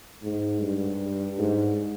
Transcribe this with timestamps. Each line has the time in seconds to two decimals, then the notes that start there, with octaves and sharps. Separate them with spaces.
0.22 G#2
0.61 G2
1.38 G#2